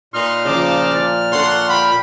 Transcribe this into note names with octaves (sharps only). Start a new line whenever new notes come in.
A#2 D#4 B4 C6 F6
C#3 F3 D#4 A5 D6
D5
D4 A4 C#5 F#5 C6
F5 G5 B5